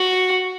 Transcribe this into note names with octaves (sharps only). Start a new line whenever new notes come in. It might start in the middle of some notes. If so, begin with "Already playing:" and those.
Already playing: F#4